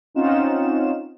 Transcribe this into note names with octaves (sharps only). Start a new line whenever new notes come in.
C4 C#4 D#4 F4 F#5 E7